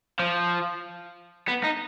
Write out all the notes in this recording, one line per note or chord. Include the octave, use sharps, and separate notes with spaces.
F3
B3
D#4